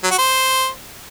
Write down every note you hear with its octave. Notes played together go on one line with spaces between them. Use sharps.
F#3
F#4
C5